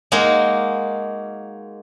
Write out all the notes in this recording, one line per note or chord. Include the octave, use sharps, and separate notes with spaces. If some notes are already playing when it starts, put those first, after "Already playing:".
G#3 A#3 D#4 F#4